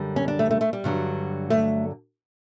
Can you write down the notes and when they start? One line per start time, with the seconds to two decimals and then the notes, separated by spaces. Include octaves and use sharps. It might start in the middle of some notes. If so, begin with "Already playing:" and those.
Already playing: F#2 D3 G3
0.16 C#4
0.28 D4
0.39 A3
0.51 A3
0.61 A3
0.73 G3
0.84 G2 D3 F#3
1.50 A3